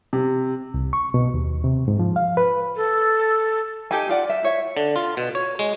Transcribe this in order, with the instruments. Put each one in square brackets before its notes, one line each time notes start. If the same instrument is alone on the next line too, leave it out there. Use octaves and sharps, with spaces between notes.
[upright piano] C3
[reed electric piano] C2
C#6
B2
D#2
C3
G#2
F3
F5
B4
[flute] A4
[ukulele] D#4 G4 A4 G#5
F4 D5 F#5
E5
E4 C#5 E5
[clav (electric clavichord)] D3
F4
B2
C#5
G#3